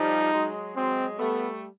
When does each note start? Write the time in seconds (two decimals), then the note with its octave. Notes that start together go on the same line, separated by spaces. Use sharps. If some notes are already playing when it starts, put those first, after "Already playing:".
Already playing: F3 G3 D#4
0.32 F#3 G#3
0.75 F#3 G#3 C4
1.19 G3 A3 B3